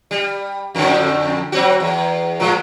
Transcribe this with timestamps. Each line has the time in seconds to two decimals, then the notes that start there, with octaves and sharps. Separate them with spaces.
0.11 G3
0.75 F2 A2 D3
1.52 F#3 C4 F#4
1.80 E2
2.40 A2 F3 G#3